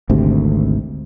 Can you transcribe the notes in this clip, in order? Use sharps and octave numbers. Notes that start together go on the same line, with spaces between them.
G#1 D2 C3